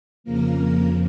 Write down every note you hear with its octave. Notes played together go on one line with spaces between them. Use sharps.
F2 C#3 F3 A#3 A#4
A#3 A#4